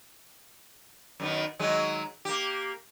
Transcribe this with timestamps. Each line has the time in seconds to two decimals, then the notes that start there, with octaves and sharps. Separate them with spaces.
1.20 F#2 D#3 B3
1.59 D#3 F#3 G#3
2.25 A#3 G4